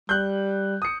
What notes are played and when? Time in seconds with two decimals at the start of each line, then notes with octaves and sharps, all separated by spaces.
0.09 G3 F#6 G6
0.82 D#6 C#7